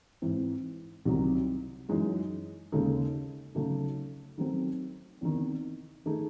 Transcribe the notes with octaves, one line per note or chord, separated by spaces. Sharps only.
G#2 E3 C4
C2 C3 D#3 F#3
F#2 E3 G#3 D#4
D#2 C#3 G#3 D#4 A4
C#3 F#3 A3 D#4
D#3 F#3 A3 C4 F#4
E2 C3 D#3
D#3 A3 D#4 G#4